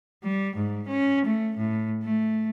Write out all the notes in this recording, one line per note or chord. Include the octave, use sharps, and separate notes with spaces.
G3
G#2
C#4
A3
A2
A3